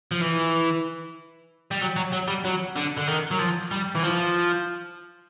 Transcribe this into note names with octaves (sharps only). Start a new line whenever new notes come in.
F3
E3
G3
F#3
F#3
F#3
G3
F#3
D3
D3
D#3
F#3
F3
G3
E3
F3